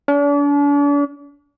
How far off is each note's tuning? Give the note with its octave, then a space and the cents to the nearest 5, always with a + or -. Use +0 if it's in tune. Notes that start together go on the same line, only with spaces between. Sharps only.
D4 -40